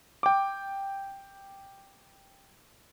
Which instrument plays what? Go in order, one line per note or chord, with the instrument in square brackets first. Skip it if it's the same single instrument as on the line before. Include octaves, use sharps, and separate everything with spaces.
[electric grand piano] G5 D6